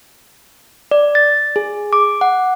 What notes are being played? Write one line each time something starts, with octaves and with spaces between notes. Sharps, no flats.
D5
A6
G#4
D6
F#5